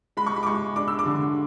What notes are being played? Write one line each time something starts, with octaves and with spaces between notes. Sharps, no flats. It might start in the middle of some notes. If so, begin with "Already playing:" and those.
G#3 B5
C#6
B5
D6
G#3 C#6
D4 D6
E6
D6
D3